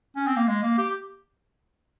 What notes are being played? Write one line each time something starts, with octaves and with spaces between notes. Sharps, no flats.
C#4
C4
A#3
G#3
A#3
G4